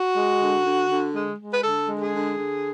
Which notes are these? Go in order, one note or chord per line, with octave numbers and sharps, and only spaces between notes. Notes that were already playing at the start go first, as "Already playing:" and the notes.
Already playing: F#4
G#3
D3
D3
D3
G#3
G#3
B4
D3 A4
G#3
G#4
D3
D3